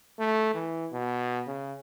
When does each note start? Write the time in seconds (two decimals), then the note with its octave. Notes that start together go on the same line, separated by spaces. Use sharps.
0.19 A3
0.54 E3
0.93 B2
1.47 C#3